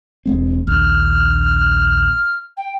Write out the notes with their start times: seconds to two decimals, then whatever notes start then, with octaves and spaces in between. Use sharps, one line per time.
0.26 E1 G#3 C4
0.67 A#1 D#2 F6
2.57 G5